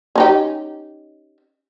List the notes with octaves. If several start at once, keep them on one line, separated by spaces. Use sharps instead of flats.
C#4 D#4 G4